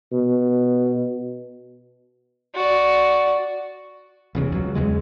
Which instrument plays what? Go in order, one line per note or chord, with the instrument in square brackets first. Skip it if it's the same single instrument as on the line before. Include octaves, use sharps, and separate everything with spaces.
[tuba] B2
[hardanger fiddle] F#4 D5
[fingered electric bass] F1 E2 C#3
C#2 F#3
E2 C#3 G#3